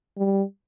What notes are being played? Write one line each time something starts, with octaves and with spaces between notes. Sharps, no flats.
G3